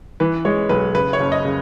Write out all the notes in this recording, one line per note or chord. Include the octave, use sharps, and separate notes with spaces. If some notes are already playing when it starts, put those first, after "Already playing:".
E3 B4
G#3 C#5
B1 B4
C#3 B4
C#5
F#1
D#5
C#3